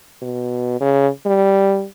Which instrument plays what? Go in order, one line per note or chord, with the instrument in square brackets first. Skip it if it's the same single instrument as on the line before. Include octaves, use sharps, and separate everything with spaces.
[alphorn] B2
C#3
G3